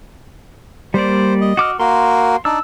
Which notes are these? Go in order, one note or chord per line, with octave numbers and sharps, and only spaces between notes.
G3 A#3 C5 D5
D#5
F#4 D6 F6
A#3 F#4 A#4 C6
D4 D#4 D5 E6